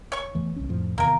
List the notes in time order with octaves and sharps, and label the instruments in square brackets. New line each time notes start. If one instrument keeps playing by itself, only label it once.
[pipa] C#5 C#6
[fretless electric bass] E2 E3 A3
C2 C#4
F2 A2 F3
[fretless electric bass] E2 C3 D#3 [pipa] A#3 A#4